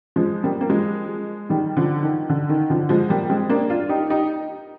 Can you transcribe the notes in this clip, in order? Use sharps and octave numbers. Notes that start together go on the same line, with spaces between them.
F3 G#3
G3 A#3
A#3
F3 G#3
D#3 G3
D3 F3
D#3
D3
D#3
D3 F3
F3 G#3
G3 A#3
G#3 C4
A#3 D4
D4 F4
D#4 G4
D#4 G4